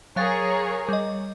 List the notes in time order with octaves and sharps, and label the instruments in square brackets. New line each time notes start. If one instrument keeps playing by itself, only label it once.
[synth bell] F#3 F5 A6 [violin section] G#4 A#4 C#5
[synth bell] G3 D#5